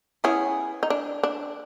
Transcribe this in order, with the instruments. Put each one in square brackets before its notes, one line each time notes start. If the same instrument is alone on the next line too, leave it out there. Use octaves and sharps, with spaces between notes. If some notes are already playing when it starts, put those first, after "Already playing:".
[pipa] B3 E4 G#4 [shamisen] C#4
[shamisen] D#4
D4
D4